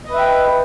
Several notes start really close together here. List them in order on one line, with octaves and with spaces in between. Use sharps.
D#5 B4 E5 G5